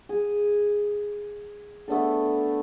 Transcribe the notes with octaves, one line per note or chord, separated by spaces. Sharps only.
G#4
A3 B3 D4 A4